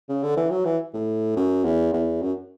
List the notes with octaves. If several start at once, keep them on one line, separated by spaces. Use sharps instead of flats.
C#3
D3
E3
F#3
E3
A2
F#2
E2
E2
F#2